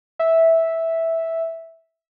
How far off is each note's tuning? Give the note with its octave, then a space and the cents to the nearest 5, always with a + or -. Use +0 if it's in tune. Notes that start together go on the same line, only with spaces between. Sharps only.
E5 -10